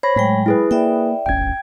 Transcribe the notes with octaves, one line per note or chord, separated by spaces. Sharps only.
C5 C#5 B5 A#6
A2 F#3 G#3 G5
E4 G#4 B4
A#3 D5 E5 G5
D1 G1 C#4 G5 G#6